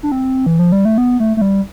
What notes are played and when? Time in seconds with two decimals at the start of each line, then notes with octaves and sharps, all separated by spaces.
0.03 D4
0.12 C4
0.46 E3
0.59 F3
0.72 G3
0.85 A3
0.98 B3
1.20 A3
1.37 A3
1.42 G3